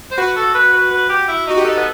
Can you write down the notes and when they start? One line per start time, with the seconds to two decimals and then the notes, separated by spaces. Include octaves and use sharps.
0.11 C5
0.17 F#4 B4
0.36 A4
0.55 B4
0.73 B4
0.91 B4
1.09 G4
1.28 E4
1.47 D#4 F#4
1.57 G4
1.65 D#4 A4
1.76 B3